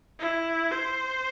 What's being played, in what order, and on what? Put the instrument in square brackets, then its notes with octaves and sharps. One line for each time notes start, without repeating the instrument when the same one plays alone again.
[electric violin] E4
C5